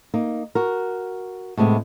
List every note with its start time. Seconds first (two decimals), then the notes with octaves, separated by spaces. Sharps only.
0.14 A#3 D#4
0.55 F#4 A#4
1.57 A2 C3 G#3 B3 G#4